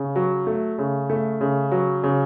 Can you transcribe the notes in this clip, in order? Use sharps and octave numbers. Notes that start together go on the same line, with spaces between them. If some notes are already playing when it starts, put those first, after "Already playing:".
Already playing: C#3
F#3
A3
C#3
A3
C#3
F#3
C#3